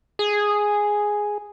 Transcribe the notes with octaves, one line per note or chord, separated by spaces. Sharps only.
G#4